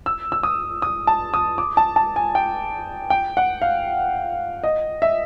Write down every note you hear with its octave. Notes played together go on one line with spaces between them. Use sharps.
E6
E6
D#6
D#6
A5
D#6
D6
A5
A5
G#5
G5
G5
F#5
F5
D#5
E5